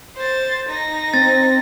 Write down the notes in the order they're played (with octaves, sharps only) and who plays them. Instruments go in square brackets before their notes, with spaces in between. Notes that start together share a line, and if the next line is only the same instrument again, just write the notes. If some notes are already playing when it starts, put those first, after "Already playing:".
[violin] C5 A6
D#4 A#6
[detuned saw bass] C4 [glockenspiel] A6